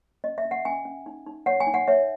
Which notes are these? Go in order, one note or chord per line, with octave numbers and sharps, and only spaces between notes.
C#4 D#5
E5
C#4
F#5
C#4 G#5
C#4
D#4
D#4
C#5 F#5
G#5
D#4
F#5
C#5 E5